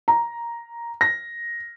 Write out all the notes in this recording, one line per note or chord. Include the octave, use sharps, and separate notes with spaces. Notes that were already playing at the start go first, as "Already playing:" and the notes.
A#5
A#6